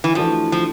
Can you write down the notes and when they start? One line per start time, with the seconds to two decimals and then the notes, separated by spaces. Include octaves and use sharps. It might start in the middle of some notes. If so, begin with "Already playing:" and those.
0.04 E3
0.15 E3 F3 A3 D4 F#4
0.52 F3